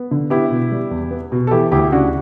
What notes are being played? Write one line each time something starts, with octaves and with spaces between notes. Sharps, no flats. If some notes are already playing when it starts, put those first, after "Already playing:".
Already playing: B3
D3
B3 E4 G4
B2
G3
E2
B3
B2
A4
E3 E4 G4
D2 E4 G4
C#3 D4 F#4